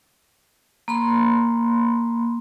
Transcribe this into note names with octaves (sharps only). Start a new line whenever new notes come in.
A#3 B5 C6